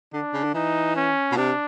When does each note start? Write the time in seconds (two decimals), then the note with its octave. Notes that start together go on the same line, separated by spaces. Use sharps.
0.13 D3 D4
0.34 C#3
0.44 D3
0.54 E3 D#4
0.96 C#4
1.32 B2
1.37 C3 D4